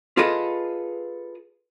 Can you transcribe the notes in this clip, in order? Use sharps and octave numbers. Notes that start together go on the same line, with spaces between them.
F4 G#4 A4 B4 D#5 F5